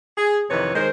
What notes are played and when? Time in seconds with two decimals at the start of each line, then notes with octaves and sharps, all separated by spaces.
0.17 G#4
0.50 F2 C3 D#3 E3 B4 C#5
0.75 D#3 G#3 D#4 A#4 C5